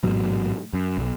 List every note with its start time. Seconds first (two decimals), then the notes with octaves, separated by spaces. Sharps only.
0.03 A1 G#2 B2 F#3
0.73 F#2
0.98 B1